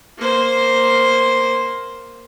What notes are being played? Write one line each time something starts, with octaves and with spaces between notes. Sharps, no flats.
A#3 C5